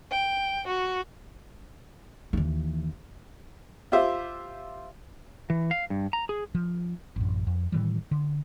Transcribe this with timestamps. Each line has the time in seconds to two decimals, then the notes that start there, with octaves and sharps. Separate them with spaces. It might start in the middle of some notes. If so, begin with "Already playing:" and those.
0.11 G5
0.68 F#4
2.33 D#2 E3
3.92 F4 G4 C5 E5
5.50 E3
5.71 F5
5.90 G2
6.13 A#5
6.29 G#4
6.55 F3
7.16 A1 F#2
7.47 F2
7.72 A2 D#3 E3 G3
8.11 D3